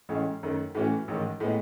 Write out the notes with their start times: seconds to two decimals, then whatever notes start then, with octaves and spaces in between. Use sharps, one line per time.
0.09 A1 A2 G#3 C#4
0.43 F#2 D#3 A3
0.75 A2 E3 A3 C#4 F#4
1.08 A1 G#2 D#3
1.40 A2 G#3 B3